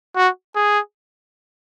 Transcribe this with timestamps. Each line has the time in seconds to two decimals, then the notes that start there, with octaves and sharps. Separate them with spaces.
0.16 F#4
0.56 G#4